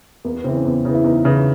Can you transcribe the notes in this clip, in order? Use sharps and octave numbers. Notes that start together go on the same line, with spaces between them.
E2 A#3
B3
C#3 E3 C4
C#4
E2
C#3 E3
E4
E2 D#4
C#3 E3